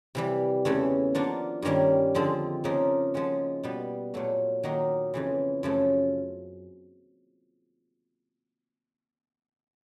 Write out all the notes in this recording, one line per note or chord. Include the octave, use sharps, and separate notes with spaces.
C3 E3 G3
E2 C#3 E3 A3 C#4
F3 A#3 D4 F#4
G2 D#3 G3 A#3 C#4
F2 D3 F3 G#3 C4
C#3 F3 A#3 D#4
F3 G#3 C#4 F#4
B2 G3 B3
A#2 F#3 A3
D#3 F#3 A#3 D#4 F#4
F2 C#3 E3
F#2 C#3 F3 A3